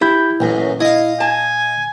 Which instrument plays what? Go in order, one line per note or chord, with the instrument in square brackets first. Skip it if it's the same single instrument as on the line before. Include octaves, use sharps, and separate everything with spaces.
[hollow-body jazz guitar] E4 [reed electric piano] G4 B5 G6
[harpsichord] A1 F#2 [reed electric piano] A#2
[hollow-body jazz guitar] E4 [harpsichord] D#5 F5
[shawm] G#5 [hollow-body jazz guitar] A5